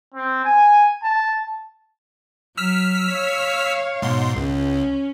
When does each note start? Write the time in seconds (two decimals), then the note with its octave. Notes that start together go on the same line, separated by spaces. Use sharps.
0.14 C4
0.44 G#5
1.03 A5
2.57 F#3 E6 F6 B6
3.11 C#5 F5
4.02 G#2 B2 C6
4.36 C#2 C#4